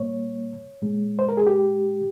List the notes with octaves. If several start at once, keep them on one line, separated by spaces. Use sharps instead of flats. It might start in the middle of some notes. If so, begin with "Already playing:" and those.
Already playing: A#2 G3 A#3 C#5
A#2 G#3
C5
A#4
G#4
G4